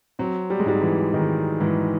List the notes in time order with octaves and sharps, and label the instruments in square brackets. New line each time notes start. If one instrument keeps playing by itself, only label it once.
[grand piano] F#3 [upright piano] C4
[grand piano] G3
G#3
[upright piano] G#2 [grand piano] G3
[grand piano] E3
[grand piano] D#3 [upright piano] G#3
[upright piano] G#2 [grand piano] E3